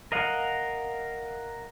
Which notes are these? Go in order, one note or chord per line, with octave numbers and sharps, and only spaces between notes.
A#4 D#5 F5 F#5